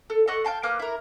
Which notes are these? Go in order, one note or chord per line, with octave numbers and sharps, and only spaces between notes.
A4
A4 D#5 F#5 C#6
F5 G5 A5 C6
A#3 B4 D6 F6
E4 A#4